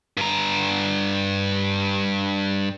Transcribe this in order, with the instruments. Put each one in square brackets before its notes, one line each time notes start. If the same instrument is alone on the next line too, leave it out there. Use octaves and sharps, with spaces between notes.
[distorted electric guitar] G2 A#5